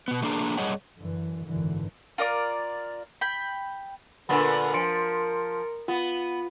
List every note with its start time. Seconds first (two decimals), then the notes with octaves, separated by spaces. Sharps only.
0.08 B2 B3
0.22 A3 A#3 D4 G#4 A#4
0.58 F#2 G3 G#4 C#5 D#5 F#5
0.99 F#2 D3 E3
1.46 G#1 F#2 D3 E3
2.18 F4 A#4 D5 D6
3.21 G5 B5
4.29 A#2 D3 B3 A#4 B4 B5
4.74 F3 C6 C#7 D7
5.88 B3 F4